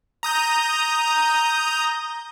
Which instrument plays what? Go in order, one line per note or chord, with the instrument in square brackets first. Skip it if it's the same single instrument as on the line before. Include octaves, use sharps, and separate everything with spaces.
[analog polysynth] A#5 D#6 G6